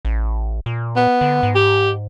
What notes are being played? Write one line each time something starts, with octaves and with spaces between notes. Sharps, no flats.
A1
A#2
B3
D3
G#2
G4